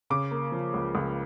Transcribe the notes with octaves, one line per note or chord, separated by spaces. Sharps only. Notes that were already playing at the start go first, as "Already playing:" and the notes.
C#3 D6
A#3
F3
C#2
C#2